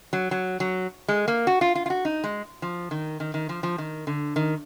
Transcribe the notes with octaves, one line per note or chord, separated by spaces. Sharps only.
F#3
F#3
F#3
G#3
A#3
F#4
F4
F4
F4
F#4
D#4
G#3
F3
D#3
D#3
D#3
F3
F3
D#3
D3
D#3